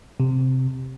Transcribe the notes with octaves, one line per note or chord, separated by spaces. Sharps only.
C3